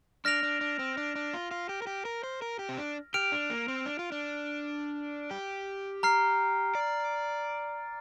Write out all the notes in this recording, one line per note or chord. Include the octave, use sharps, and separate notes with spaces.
D4 F6 A#6 D7 F7
D4
D4
C4
D4
D4
F4
F4
G4
A#4
G4
A#4
C5
A#4
G4
C4
D4
G4 F6 D7 F7
D4
A#3
C4
D4
F4
D4
G4
A#5 F6 C7
D5